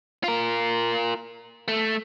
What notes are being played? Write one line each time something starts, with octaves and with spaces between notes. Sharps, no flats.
F4 A#4
A3